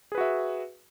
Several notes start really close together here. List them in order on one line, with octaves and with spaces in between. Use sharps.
G#4 B4 F#4 E5